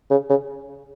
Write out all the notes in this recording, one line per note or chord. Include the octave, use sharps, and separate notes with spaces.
C#3
C#3